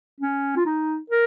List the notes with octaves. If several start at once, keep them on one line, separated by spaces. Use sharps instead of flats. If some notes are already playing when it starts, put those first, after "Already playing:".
C#4
F4
D#4
A#4